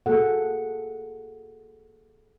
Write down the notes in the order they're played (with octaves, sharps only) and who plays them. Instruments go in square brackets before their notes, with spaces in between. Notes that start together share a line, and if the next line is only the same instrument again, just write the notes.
[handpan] A#3 F#4 G#4 A4 F#5